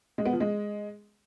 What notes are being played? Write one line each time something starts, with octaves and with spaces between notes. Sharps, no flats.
G#3
B3
F3
G#3